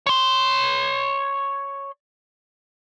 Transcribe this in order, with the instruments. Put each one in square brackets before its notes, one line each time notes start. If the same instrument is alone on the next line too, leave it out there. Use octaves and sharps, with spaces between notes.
[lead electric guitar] C#5 C6